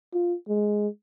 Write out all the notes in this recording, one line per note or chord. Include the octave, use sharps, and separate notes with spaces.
F4
G#3